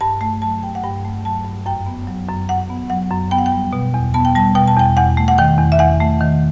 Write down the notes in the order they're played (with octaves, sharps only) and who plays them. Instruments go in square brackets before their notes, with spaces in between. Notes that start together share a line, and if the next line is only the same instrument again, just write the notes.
[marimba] G2 A5
A3 A5
F#3 A5
G2 G5
F#5
G2 G5
A3
F#3 A5
G2
F#2 G5
B3
F#3
F#2
F#2 F#5
B3
F#3 F#5
F#2
B3 G5
F#5
G5
G3
B2
E2
B3 A5
G5
G3 A5
B2 G5
A5
E2 G5
E2 F#5
A3
F#5
D#3 G5
E2
E5
E2 F#5
A3
D#3